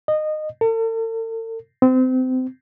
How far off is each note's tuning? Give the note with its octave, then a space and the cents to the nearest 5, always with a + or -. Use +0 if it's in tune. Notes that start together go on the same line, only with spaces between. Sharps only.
D#5 -20
A4 +45
C4 -30